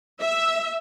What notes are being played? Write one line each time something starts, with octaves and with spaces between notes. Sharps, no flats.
E5